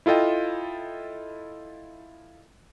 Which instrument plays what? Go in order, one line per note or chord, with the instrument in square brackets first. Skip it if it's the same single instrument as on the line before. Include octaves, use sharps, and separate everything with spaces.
[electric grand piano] E4 F4 A4 D#5 G5